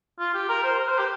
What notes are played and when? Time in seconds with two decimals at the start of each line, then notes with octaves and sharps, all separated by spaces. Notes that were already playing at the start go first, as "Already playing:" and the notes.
0.19 F4
0.34 G4
0.49 A#4
0.64 C5
0.79 A#4
0.89 C5
0.98 G4